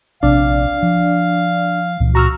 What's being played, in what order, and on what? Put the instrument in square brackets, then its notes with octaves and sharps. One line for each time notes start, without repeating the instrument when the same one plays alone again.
[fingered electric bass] A#1 C3 C4 [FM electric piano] D4 D5 [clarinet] F5
[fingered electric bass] F3
C#2 A#2 E3
[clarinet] F#4 [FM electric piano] A#5 E6 F6